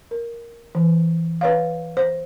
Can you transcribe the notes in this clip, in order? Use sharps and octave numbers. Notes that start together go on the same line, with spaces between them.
A#4
E3
B4 C#5 F5
C5